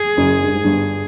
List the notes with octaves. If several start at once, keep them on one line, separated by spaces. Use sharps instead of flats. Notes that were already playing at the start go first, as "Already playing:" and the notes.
Already playing: G#4
F#1 F#2
G2
G#2
G1 G2